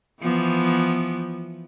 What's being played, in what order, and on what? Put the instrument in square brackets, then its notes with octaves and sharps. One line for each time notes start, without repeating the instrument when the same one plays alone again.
[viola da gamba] E3 F3 B3